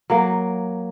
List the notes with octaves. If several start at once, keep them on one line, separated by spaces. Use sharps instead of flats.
F#3 A#3